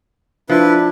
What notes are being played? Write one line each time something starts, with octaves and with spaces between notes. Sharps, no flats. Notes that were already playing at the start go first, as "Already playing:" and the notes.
F3 D4 E4 B4